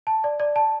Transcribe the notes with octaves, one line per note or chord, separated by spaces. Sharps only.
A5
D5
D5
A5